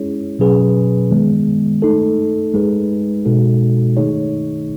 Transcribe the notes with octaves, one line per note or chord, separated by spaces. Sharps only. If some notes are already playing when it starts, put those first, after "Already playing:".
Already playing: G#3 C#4 E4 G#4 C#5
B2 F#3 C#4 G#4 B4
D#3 G#3 B3
A3 D#4 A4
G#3 D#4 G#4 B4
B2 G#3 D#4 F#4 A4
D#3 A3 D#4 G#4 C#5